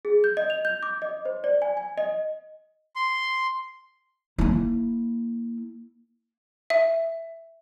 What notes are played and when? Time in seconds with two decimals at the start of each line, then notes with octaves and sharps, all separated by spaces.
0.05 G#4
0.24 G6
0.37 D#5
0.50 F7
0.65 G6
0.83 D6
1.02 D#5
1.25 C5
1.44 D5
1.62 G#5
1.77 G#5
1.98 D#5
2.96 C6
4.38 A#3 E4
6.70 E5